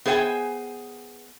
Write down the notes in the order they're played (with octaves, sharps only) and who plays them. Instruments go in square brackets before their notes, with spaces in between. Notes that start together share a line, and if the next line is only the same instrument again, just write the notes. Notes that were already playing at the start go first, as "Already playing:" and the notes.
[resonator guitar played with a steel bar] B3 G#4 C5 F5 G5 G#5